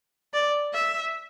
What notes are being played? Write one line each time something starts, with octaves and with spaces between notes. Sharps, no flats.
D5
E5